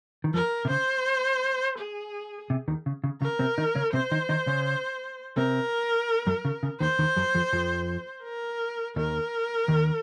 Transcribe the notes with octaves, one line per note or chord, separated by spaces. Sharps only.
D#3
F2 F3 A#4
C3
C#3 C5
G#4
C3
D#2 D#3
C#3
C#3
C#3 A#4
C3 C4
D#3 D#4
C#3 C#4
C3 C4 C5
D#3 D#4
D#3 D#4
C#3 C#4
C3 C4 A#4
F#2 F#3
C#3
C#3
D#2 D#3 C5
D#2 D#3
F#2 F#3
F2 F3
F2 F3
A#4
D#2 D#3 A#4
D#2 D#3